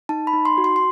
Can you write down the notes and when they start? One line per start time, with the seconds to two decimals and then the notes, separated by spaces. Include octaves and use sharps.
0.09 D#4 A5
0.27 B5
0.33 D#4
0.45 C6
0.58 F#4
0.64 C6
0.76 C6